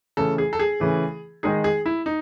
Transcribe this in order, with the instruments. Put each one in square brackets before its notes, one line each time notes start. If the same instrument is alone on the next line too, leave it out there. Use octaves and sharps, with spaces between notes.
[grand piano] C#3 E3 A3 [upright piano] A4
[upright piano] G#4
A4
G#4
[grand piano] C#3 E3 A3
[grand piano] D#3 G#3 D#4 [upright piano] G#4
[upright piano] G#4
E4
D#4